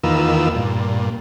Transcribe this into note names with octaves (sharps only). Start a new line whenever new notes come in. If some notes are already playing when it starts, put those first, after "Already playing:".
E2 D#3 A#3 F4 B4 E6
G2 A#2